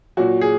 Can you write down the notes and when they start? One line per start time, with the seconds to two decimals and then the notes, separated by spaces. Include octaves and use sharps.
0.17 A#2 F#3 F#4
0.41 G#4